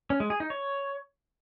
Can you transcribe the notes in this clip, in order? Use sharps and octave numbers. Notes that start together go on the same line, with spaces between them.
C#4
G#3
G#4
D#4
C#5